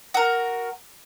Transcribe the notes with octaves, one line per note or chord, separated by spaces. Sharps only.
F#4 A#4